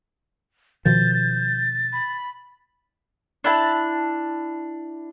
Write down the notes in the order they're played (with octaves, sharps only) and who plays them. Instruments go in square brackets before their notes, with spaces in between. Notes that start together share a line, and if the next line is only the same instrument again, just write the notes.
[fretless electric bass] B2 D#3 F3 [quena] G6 [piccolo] A6
[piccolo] A6
[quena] B5
[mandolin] D4 E4 A5